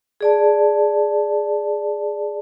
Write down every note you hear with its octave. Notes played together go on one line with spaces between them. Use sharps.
G#4 D5 A5